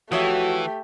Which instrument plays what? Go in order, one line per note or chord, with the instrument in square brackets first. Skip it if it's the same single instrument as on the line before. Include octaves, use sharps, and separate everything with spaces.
[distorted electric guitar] E3 [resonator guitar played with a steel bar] F3 C#5 E5 [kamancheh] A3 G4 [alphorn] F#4